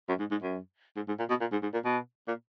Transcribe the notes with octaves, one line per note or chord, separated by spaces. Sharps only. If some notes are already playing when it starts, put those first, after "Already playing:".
F#2
G#2
G#2
F#2
G#2
G#2
A#2
B2
A#2
G#2
G#2
A#2
B2
A#2